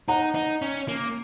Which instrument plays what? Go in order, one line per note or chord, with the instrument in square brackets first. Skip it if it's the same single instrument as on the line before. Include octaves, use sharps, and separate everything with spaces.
[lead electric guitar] D#4 [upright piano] F#5 A#5
[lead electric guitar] D#4
C#4
A#3